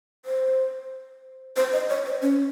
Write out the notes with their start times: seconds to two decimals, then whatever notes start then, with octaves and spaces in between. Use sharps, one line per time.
0.25 C5
1.56 C5
1.73 D#5
1.90 C#5
2.06 C5
2.22 C#4